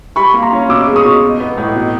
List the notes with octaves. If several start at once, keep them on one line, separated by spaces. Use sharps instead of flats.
G3 B5 C#6
A#3
A#5 C6
C#4
B2 D6 E6
G#3
C#6 D#6
B2
D#4
B3
A2
B2